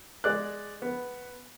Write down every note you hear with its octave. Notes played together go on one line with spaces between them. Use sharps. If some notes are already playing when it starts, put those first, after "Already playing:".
G#3 D5 F#6
B3